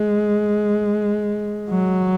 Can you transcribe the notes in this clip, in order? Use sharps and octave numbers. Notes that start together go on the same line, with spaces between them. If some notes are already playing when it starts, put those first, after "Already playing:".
Already playing: G#3
F#3